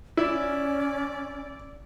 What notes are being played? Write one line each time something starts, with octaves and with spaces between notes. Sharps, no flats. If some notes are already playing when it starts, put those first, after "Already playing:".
C#4 E4 D5